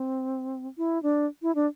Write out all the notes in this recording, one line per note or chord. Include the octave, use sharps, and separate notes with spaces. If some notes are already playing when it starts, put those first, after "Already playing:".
Already playing: C4
E4
D4
E4
D4